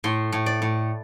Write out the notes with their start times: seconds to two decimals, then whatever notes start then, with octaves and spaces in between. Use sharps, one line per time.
0.04 A2 C6
0.32 A2
0.46 D5
0.62 A2